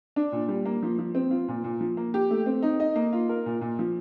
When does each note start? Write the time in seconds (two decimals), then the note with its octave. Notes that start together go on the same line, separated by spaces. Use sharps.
0.16 D4
0.32 A#2
0.49 G3
0.65 A#3
0.83 F3
0.99 F3
1.15 C4
1.31 F4
1.48 A#2
1.64 A#2
1.81 F3
1.97 A#3
2.14 G4
2.31 A3
2.46 C4
2.63 D#4
2.80 D#5
2.96 A#3
3.13 F4
3.29 A#4
3.46 A#2
3.61 A#2
3.79 F3